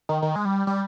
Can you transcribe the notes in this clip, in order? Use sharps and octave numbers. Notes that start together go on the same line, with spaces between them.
D#3
D#3
G#3
G3
G3